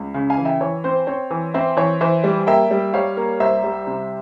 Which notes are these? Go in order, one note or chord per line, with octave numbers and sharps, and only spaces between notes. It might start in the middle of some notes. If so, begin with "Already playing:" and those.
Already playing: C#2
C#3
F5 G#5
E3
E5 G5
E3 C#5
C4 C5
C4 C#5
E3
C4 C5 E5
E3 C#5
E3 C5 E5
G3
A#3 E5 G5
G3
G3 C#5 F5
A#3
C2 C5 E5
G3
C3